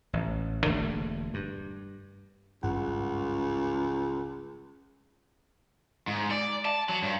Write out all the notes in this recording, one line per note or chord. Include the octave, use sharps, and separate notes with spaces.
A1
E1 D3 A3 A#3
G2
G#1 C#2 G2 F#5
G#2
D5
A5
F#3
G2